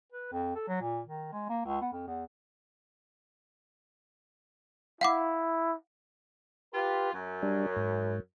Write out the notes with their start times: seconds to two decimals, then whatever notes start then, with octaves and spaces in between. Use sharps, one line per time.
0.12 B4
0.32 F2
0.55 A4
0.68 F#3
0.81 A#2
1.07 D#3
1.32 G#3
1.49 A#3
1.66 C#2
1.81 B3
1.92 F2
2.07 E2
5.01 E4 F5 F#5 D6
6.74 F4 G4 B4
7.13 F#2
7.42 G3 D4
7.76 G#2